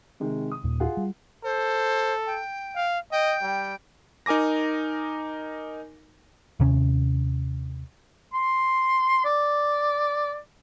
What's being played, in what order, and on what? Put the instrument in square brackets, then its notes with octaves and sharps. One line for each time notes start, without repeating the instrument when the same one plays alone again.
[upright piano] C3 D#3 G#3
D#6
[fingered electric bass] D#2 A#2
[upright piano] F4 G#4 F#5
[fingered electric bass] G3
[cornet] A4 [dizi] C5
[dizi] G5
[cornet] F5
[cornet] D#5 [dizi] G5
[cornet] G3
[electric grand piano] D#4 A#4 G#5 D6 A#6
[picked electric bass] D#2 C3 C#4
[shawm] C6
D5